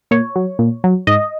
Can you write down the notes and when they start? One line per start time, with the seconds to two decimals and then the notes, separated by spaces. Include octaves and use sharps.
0.11 A#2 C#5
0.36 F#3
0.59 A#2
0.84 F#3
1.07 G#2 D#5